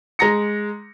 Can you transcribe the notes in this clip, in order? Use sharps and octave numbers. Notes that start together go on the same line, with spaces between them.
G#3 A#5 A#6 C#7